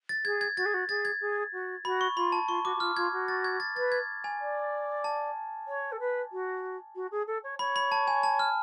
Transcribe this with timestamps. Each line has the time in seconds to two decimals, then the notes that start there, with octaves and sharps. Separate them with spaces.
0.09 A6
0.25 G#4 G#6
0.41 G#6
0.57 F#4 A6
0.65 G#4
0.74 F#4
0.89 G#4 A6
1.05 G#6
1.21 G#4
1.53 F#4
1.85 F#4 B5
2.01 C#6
2.17 F4 B5
2.32 A5
2.48 F4 C#6
2.65 F#4 D6
2.76 F#4
2.80 F4 F6
2.97 F4 G#6
3.12 F#4
3.28 A6
3.44 G#6
3.60 A6
3.76 B4 A6
3.92 G#6
4.24 G#5
4.41 D5
5.04 A5
5.68 C#5
5.92 A4
6.00 B4
6.32 F#4
6.95 F#4
7.11 G#4
7.27 A4
7.43 C#5
7.59 C#5 B5
7.76 B5
7.92 A5
8.08 G#5
8.23 A5
8.39 F6